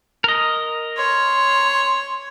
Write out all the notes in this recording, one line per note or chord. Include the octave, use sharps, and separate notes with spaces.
A#4 D#5
C#5 C6